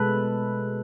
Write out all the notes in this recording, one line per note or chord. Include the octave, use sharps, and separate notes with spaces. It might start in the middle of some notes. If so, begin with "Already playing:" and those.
Already playing: B2 G#3 A4 B4